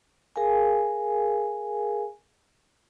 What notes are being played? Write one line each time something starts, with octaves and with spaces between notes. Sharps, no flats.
G#4 A#4 F5 G#5